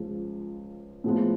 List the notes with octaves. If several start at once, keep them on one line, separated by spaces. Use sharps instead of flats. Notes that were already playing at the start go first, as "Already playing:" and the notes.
Already playing: C#2 C#3 F3 G#3
A2 F3 G#3 B3